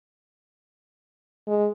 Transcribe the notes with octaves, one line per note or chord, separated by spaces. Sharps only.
G#3